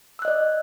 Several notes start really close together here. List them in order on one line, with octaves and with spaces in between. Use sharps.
E6 F#6 D#5 D5